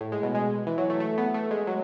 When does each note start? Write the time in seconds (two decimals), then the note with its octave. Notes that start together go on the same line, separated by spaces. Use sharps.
0.01 A2
0.12 G#3
0.23 B2
0.35 G#3
0.67 E3
0.78 F#3
0.90 A3
1.00 A3
1.18 B3
1.34 A3
1.51 G#3
1.67 F#3